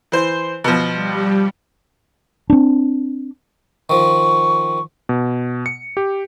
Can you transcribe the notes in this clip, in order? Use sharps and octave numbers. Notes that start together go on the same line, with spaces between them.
E3 C5
B2 F3
G3
C4 D4
D#3 F3 C#6
B2
C#7
G4